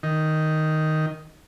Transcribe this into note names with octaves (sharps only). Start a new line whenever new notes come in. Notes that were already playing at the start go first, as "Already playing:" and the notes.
D#3